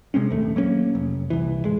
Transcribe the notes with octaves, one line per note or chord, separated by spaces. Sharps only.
C3 G#3 C4 C#4
A#1 D#2 A3
F#3 A#3 B3 C#4
F1
C2 E3
D1 G#3